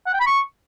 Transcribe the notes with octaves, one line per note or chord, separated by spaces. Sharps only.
F#5
G5
B5
C#6